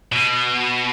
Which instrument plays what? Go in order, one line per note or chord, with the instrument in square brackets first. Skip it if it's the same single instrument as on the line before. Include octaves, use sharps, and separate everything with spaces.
[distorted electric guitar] B2